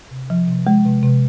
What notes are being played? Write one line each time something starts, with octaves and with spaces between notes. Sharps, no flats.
C3
F3
C3
G#3
C3
C3